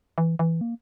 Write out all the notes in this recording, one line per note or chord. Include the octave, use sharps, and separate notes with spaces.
E3
E3
A#3